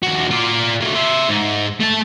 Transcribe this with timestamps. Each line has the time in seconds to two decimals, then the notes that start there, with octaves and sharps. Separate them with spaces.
0.03 D#2 F#4
0.31 F4 D5
0.81 F#3 A3
0.95 C5 E5
1.28 G#2
1.80 A3 A5